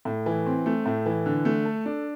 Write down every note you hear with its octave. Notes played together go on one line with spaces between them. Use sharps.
A2
E3
C4
A3
A2
E3
D3
A3
A4
D4